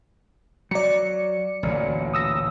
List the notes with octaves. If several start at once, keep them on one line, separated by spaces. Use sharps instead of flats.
F#3 D5 C#7
A1 D2 A#2
D#6 E6 A#6